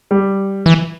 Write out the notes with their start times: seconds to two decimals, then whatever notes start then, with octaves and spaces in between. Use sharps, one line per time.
0.11 G3
0.66 E3